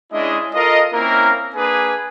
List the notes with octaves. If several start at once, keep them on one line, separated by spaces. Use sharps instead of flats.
G#3 C#4 D4 E4 G#4 D#5
F4 A4 A#4 D#5
A#3 C4 C#4 E4 A#4
A#3 D4 G#4 B4 G#5